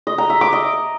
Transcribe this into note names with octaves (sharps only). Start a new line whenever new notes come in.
D#5
A#5
E5
D6
D#5